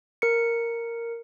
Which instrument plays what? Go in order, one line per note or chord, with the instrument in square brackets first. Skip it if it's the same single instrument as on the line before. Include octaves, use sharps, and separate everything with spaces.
[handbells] A#4 C#7